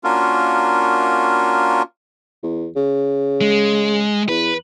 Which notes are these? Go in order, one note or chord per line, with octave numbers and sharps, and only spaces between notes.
A#3 C#4 D4 F4 F#4 A#4
E2
C#3
G#3
E2 B4